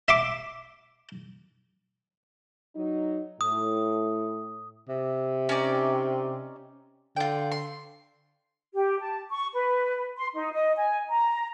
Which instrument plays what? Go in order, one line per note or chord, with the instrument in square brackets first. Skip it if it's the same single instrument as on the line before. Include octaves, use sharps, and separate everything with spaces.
[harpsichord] E5 C6 D6
[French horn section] F#3 D#4
[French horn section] A2 [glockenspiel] D#6
[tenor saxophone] C3
[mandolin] C#4 D#4 D5
[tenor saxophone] D3 [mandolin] F4 G5
[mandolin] C6
[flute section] G4
A5
C#6
B4
C6
D#4
D#5
G#5
A#5